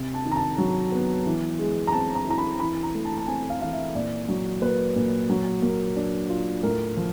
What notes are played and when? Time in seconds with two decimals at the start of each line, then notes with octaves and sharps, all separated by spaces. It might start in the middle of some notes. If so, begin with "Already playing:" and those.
Already playing: C3
0.14 A5
0.25 D#3
0.31 A#5
0.36 A5
0.58 F#3
0.92 B3
1.26 E3
1.59 G#3
1.87 A#5
1.92 C4 A5
2.15 A#5
2.27 E4 A#5
2.38 B5
2.60 E3 B5
2.83 A#5
2.94 A3
3.05 A5
3.18 A5
3.27 C4 G#5
3.50 F5
3.61 E3 F5
3.73 E5
3.95 A#2 D5
4.28 F#3
4.61 A#3 B4
4.96 A#2
5.30 F#3
5.62 A#3
5.96 D4
6.30 F4
6.63 A2 A#4
6.97 F3